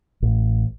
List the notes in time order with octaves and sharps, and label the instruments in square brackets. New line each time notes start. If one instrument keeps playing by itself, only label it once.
[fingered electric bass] A1